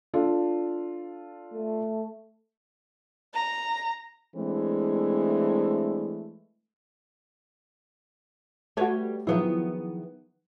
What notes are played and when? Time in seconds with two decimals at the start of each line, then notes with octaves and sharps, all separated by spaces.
0.14 D4 F4 A4
1.54 A3
3.34 A#5
4.35 E3 G#3 A3 C4 D4
8.77 G3 A3 F#4 B4 C#5
9.27 D#3 F3 F#3 B3 E4 G#4